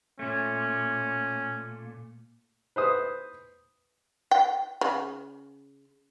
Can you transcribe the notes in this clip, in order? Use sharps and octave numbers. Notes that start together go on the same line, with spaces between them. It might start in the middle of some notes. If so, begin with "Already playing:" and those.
A#2 A3 C#4
B4 C5 D#6
G5
C#3